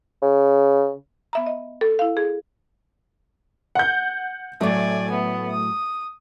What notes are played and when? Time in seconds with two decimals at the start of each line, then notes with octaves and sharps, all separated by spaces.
0.22 C#3
1.33 B3 E5 A#5
1.46 D#5
1.81 A4
1.99 E4 F5
2.17 G#4
3.75 F#5 G6
4.61 A2 F#3 A3 D5 G#5
5.11 B3
5.50 D#6